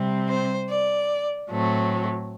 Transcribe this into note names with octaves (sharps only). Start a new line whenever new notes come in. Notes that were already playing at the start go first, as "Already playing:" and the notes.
Already playing: C3 G3 C4
C5
D5
A2 F#3 A3 C4